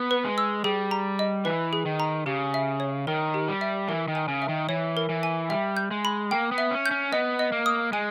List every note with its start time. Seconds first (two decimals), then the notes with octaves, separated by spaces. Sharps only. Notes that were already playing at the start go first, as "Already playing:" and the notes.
Already playing: B3
0.11 B4
0.25 G#3
0.38 E6
0.64 G3 G#4
0.91 A#5
1.19 D#5
1.45 E3 B4
1.73 G#4
1.86 D#3
2.00 A#5
2.26 C#3 G4
2.54 E5
2.80 C#5
3.07 D#3 A#4
3.34 G4
3.48 G3
3.61 E5
3.88 E3 A#4
4.08 D#3
4.15 G#5
4.28 C#3
4.42 E5
4.49 D#3
4.69 E3 C#5
4.97 A#4
5.09 E3
5.23 G#5
5.50 G3 E5
5.77 G6
5.91 G#3
6.05 B5
6.31 A#3 G5
6.52 B3
6.58 E5
6.71 C#4
6.86 G6
6.91 C#4
7.12 B3 D#5
7.39 D#5
7.52 A#3
7.66 D#6
7.92 G#3 G#5